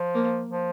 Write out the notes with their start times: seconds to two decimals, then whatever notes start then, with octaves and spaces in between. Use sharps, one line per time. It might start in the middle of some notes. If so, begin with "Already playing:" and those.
Already playing: F3
0.15 A#3
0.49 F3